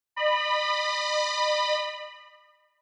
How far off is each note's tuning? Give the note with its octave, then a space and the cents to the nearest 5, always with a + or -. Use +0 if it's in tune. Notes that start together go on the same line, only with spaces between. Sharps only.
D#5 -45 B5 +0